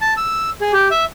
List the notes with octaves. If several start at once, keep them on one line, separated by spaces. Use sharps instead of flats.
A5
E6
G#4
G4
E5